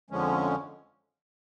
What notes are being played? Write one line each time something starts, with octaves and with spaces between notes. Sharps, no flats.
F2 D3 F3 G#3 C#4